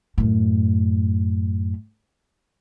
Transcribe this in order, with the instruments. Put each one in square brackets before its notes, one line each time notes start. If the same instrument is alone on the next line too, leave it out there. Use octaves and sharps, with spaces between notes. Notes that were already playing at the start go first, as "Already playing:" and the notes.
[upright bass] F#2 A2